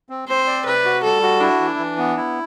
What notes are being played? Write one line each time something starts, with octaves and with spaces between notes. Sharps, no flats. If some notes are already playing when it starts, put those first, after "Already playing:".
C4
C4 C5
D5
C3 B4
F#4
G3 A4
F#4
D4 E4
E3
E3
B3
E4